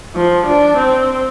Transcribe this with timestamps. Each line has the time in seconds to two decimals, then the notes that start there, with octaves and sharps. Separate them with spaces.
0.15 F3
0.47 D4
0.78 C4